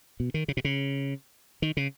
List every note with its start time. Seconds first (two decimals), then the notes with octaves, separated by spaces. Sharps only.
0.20 B2
0.34 D#3
0.48 C#3
0.57 B2
0.64 C#3
1.62 D#3
1.77 C#3